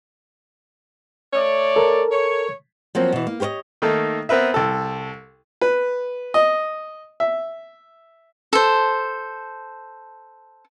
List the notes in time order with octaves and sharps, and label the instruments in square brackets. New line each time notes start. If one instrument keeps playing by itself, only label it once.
[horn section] A3 C#5 D5
[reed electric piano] A4 A#4
[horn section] C#5
[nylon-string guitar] F3 F#3 A#3 C4
B2 E3
A#3
G4 G#4 C5 C#5 D#5
[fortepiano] D#3 A3 A#3 D#4 A4
B3 C4 A#4 B4 E5
C2 A4
B4
D#5
E5
[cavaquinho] A4 C5